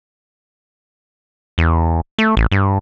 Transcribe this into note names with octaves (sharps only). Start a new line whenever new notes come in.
E2
A3
A1
G2